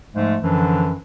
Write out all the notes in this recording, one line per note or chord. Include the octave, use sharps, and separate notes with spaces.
G#2 F3 G#3 A3
F#2 D3 E3 F3 D4